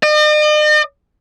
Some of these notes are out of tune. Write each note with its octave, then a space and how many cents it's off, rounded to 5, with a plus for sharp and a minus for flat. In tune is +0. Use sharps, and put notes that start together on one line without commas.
D#5 -45